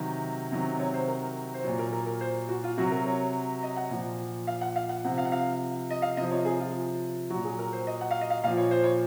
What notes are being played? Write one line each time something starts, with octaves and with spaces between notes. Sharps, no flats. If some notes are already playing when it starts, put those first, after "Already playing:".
Already playing: C3 D#3 F#3
C3 D#3 F#3
C#5
C5
A#4
C5
A#2 F#3 C#5
A#4
A#4
A#4
C5
F#4
F4
C3 F#3 F#4
A#4
C#5
D#5
F#5
A#2 F3
F5
F#5
F5
F#5
C3 F3 F#5
F5
F#5
F5
D#5
F5
C3 F3 D#5
C#5
G#4
F4
A#2 F#3 F#4
G#4
A#4
C5
D#5
F#5
F5
D#5
F5
A#2 F3 F5
C#5
C5
C#5